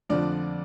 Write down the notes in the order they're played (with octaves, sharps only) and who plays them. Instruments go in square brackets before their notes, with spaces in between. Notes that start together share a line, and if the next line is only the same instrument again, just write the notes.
[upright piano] F2 D3 F3 D4 D5